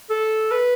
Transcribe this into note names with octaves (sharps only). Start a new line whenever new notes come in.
A4
B4